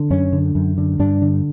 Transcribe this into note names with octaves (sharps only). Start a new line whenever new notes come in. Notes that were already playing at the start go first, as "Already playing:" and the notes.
Already playing: D3
F#2 C#4
D3
F#2
D3
G2 D4
D3